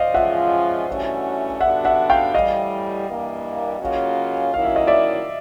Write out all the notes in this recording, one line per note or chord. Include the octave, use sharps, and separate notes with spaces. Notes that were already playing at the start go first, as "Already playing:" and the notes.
Already playing: C5 D5 D#5 F5
F3 G#3 C#4 F4 E5 F#5
G2 E3 A3 C#4 F#4
D3 G3 B3 D4 F#4 E5 F#5
E5 F#5
F5 G5
A2 E3 G3 D#5 F5
G2 E3 G3 A#3
C#3 F#3 A#3 C#4 F4
D#3 F#3 A#3 C#4 E4 F5
E5
D#5
D5 E5